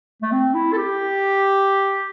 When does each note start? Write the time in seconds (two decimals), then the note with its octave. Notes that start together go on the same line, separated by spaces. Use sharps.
0.22 A3
0.32 C4
0.54 E4
0.72 A4
0.77 G4